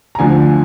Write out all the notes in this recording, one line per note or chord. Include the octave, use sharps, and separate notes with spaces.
A#5
D2 D3 F3 G#5